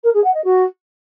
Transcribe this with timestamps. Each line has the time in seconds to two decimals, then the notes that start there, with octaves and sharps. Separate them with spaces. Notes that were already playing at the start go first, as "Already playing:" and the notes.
0.03 A#4
0.13 G#4
0.24 F#5
0.34 D#5
0.44 F#4